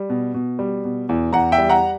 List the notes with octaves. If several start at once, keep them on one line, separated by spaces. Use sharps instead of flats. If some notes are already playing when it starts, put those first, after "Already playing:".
Already playing: G3
B2
B2
G3
B2
E2
E2 F#5 A#5
E5 G5
G3
F#5 A#5